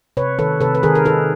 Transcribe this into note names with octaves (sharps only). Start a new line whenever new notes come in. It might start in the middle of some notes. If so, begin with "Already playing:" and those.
C3 B4 C#5
D#3 A4 B4
C3 A4 B4
B4
D#3 G#4 A#4
A#4
D#4 A4 B4